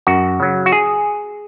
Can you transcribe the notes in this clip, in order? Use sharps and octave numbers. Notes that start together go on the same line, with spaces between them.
F#2 F#4
C#3 F#3
F#4
G#4